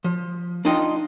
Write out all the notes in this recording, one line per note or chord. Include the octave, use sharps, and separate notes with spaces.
F3
D4 D#4 F4 D#5 G5